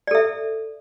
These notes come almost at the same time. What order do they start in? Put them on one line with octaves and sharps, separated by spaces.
D5 A4 E5